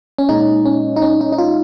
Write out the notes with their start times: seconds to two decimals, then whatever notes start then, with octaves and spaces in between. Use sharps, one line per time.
0.18 C#4
0.29 A#2 G#3 D#4
0.65 C#4
0.96 D#4
1.02 C#4
1.21 D#4
1.32 D#4
1.38 F4